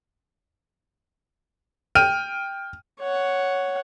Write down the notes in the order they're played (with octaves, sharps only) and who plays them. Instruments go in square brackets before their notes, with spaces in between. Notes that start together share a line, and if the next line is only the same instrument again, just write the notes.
[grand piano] G5 F6 D#7
[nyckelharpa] C#5 F#5